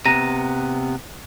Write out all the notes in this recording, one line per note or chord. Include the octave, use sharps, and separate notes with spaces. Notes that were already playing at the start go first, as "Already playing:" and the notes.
C3 B3 A#5 A#6 D#7